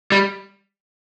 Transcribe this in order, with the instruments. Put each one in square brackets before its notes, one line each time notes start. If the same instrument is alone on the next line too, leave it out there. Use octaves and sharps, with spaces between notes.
[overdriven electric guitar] G3